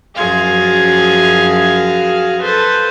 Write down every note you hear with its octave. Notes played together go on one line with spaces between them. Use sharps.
F#2 F3 F#4 G#4 F5 G#6
A4 B4 C5